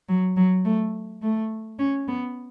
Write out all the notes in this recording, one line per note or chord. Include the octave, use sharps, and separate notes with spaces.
F#3
F#3
A3
A3
C#4
B3